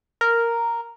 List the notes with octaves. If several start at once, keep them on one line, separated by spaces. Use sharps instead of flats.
A#4